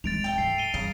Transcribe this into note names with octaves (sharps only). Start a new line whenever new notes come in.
D1 G#3 A6 D7 F7
A3 G5
G#2 C7
D#7 G7
G2 C#3 F5 A#5